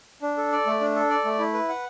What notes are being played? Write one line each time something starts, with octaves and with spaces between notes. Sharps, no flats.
D4
A4
D5
A3
D4
A4
D5
A3
E4
B4
F#5